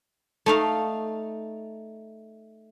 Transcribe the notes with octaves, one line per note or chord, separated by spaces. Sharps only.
A3 D#4 F5